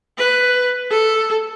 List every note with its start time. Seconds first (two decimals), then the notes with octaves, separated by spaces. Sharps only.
0.18 B4
0.91 A4